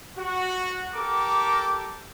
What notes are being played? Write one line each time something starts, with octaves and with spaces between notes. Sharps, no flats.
F#4
G4 A4 A#4 D6